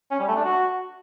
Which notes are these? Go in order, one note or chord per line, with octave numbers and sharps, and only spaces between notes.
C#4
G3
A3
D4
F#4